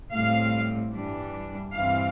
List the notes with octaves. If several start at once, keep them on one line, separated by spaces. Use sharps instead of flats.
A2 G3 C4 F5
G2 E3 G3 D4
G2 E3 G3 C4 F5